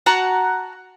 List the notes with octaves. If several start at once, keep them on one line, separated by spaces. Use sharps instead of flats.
F#4 F#5 A5 A#5